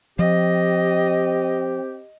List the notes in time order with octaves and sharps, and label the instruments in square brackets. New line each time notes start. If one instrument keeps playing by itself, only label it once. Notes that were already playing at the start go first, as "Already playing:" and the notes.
[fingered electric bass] F3 [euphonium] C4 [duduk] G4 [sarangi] D#5